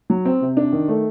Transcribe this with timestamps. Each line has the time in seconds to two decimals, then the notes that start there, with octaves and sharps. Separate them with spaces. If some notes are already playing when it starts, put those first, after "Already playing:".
0.10 F#3
0.25 C4
0.41 C3
0.57 D4
0.73 D#3
0.88 A3